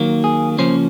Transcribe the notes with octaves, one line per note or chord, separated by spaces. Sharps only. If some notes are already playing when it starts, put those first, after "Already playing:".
Already playing: D#3 F#3 A#3
G#4
C#3 F3 A#3 C#4 C5